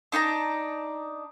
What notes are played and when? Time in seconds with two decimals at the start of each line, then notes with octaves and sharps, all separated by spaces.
0.12 D4 D#4 A5 A#5